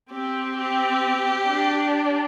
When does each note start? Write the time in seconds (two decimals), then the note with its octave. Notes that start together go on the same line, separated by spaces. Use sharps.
0.11 C4 G4
0.57 G4
1.47 D4